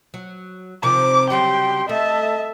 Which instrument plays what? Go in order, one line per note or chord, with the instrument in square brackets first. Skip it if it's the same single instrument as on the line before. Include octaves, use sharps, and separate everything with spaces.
[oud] F#3
[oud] C3 D#3 F3 [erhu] D6
[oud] C#3 F#3 G3 [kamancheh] G4 C6 [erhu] G5
[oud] A3 [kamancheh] D#5 A5 [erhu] E5